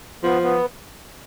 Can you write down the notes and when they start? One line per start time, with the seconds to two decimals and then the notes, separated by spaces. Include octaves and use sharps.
0.24 F3 B3
0.42 B3